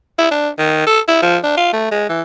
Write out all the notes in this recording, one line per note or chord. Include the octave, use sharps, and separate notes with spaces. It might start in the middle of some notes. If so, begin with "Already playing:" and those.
E4
D4
D#3
A4
E4
F3
D4
F4
A3
G#3
E3